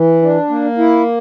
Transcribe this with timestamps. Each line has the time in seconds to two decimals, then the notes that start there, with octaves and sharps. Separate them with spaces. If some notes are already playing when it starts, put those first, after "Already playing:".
Already playing: E3
0.22 D4
0.50 A#3
0.78 E4